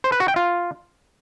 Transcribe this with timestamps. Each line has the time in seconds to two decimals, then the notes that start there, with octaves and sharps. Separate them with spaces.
0.04 C5
0.12 B4
0.20 F#4
0.28 G5
0.36 F4